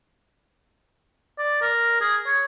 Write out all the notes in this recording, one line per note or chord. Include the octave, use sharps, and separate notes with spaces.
D5
A#4
G#4
C#5